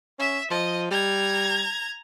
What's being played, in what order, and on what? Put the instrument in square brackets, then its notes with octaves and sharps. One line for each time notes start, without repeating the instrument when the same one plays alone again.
[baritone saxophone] C#4 [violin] E5
[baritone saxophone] F3 [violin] D#5
[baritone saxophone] G3 [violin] A#5 G#6